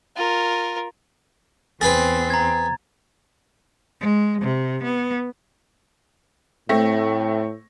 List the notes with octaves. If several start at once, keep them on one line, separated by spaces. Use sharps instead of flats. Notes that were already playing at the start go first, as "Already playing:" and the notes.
F4 A#4
E2 C4 G#4 B4 A6
A#5 G#6
G#3
C3
B3
A2 A3 C4 A#6